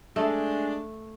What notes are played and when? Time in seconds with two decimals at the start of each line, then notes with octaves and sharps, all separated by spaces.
0.16 G#3 A3 D4